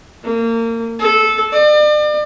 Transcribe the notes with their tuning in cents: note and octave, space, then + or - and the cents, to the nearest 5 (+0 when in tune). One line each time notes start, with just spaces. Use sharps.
A#3 -30
A4 -15
D5 +40